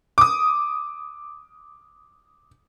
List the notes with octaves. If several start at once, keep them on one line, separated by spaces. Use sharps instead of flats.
D6 D#6